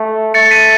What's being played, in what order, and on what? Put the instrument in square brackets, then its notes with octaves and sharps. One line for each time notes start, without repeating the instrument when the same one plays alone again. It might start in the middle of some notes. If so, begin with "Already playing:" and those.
Already playing: [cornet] A3
[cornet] A3 [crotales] A6 C#7
[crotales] B6 D#7